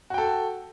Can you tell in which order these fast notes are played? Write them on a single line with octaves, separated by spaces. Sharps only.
F#4 G5 A4